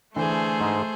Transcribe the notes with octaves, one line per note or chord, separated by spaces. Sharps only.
D3 E3 A3 G#4 C5
G#2 G#3